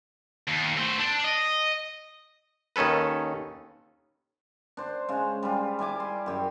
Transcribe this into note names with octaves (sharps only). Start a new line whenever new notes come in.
D#2
A3 C5
D4
D#5
D#2 D#3 C#4 A4 B4
D4 C5
C#3 G#3
G3 F4
G3 E4 G#5 D6
C6
F#2 G4 G#5